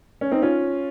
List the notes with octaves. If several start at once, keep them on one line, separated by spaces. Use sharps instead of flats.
C#4
C4 D#4
C#4 F4